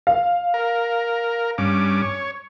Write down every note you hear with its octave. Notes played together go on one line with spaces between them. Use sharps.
F5
A#4
G2 C#4 D6
C#5